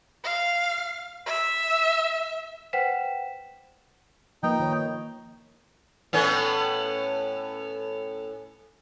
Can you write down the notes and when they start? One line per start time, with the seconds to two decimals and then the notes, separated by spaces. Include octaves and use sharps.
0.24 F5
1.26 E5
2.73 B4 C5 F#5 G5 B6 E7
4.43 F3 A#3 D#4 B4 G5
4.60 D#3 C#5
6.13 A2 B3 C#4